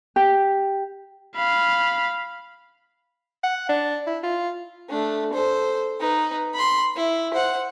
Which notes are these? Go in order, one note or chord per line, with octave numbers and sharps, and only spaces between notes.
G4
F5 B5
F#5
D4
E4
F4
A3 D4
A4 C5
D#4 B4
B5 C6
E4
C5 F#5